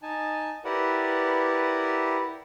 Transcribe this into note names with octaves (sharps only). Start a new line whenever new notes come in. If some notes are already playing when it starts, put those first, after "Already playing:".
D#4 G#5 A5
E4 G4 A#4 B4 D5 F#5